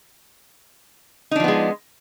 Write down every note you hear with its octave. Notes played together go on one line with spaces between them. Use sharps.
F3 G#3 B3 D4 D#4